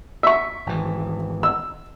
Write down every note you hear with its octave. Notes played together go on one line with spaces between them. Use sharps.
E5 C#6
G#1 E3
E6